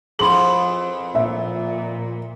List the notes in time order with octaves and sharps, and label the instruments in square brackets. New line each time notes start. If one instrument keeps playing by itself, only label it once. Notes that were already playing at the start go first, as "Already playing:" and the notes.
[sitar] F2 B3 E4 [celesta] G#4 C6 [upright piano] B5 F#7
[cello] A#2 [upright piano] E5